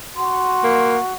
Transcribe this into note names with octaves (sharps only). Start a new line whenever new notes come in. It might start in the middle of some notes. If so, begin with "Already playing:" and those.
F#4 C6
A#3